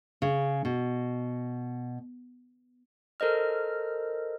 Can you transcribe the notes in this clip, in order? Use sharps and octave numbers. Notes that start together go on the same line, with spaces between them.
C#3
B2
A4 A#4 C5 D#5 F6